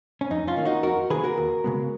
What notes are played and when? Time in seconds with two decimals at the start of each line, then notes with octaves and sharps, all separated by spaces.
0.21 C#4
0.30 F2 D#4
0.48 C#4 F4
0.57 D#3 A#3
0.65 D#4 F#4
0.83 F2 F#4 A#4
1.10 D#3 A#3 G#4 B4
1.24 F#4 A#4
1.37 D#2
1.64 C#3 G#3 B3